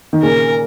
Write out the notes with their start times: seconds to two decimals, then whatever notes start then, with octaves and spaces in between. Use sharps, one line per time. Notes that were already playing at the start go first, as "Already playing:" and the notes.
0.13 D#3
0.23 A#2 C#3 A#4